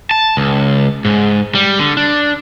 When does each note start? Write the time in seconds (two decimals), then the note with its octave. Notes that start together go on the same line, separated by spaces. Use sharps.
0.11 A5
0.37 C#2
1.05 G#2
1.55 G3
1.79 D3
1.97 D4